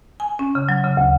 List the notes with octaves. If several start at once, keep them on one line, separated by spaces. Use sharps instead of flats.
G#5
C#4
C#3
F#3
C#3
D2